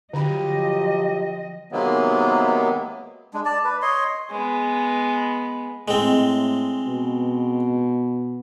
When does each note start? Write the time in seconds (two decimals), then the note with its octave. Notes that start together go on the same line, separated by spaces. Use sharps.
0.13 D3 F3 F#3 F4 G4 D#5 B5
1.72 C3 D#3 F#3 G#3 A#3 B3
3.33 G#3 D4
3.45 D5 A5
3.64 B4
3.82 C#5 D#5 C6
4.31 G#3 B3
5.88 A2 G#3 C4
6.87 B2